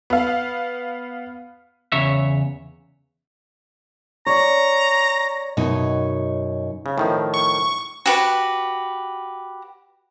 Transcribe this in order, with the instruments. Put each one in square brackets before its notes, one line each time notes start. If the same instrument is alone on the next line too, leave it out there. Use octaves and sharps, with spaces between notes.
[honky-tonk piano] B3 F5
[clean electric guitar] E2 C#3 C#5 E5
[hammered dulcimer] C#5 D5 [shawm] A#5
[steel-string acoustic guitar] F#2 B2 D#4 C#5
[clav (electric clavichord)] C#3
A2 D#3 F3
[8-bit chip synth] C#6
[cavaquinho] F#4 G4 B4